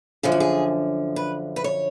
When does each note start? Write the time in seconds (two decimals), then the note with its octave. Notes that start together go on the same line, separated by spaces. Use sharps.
0.23 F#2 D3 F3 G#4
0.32 F#4
0.40 G#4
1.16 B4
1.56 B4
1.64 C#5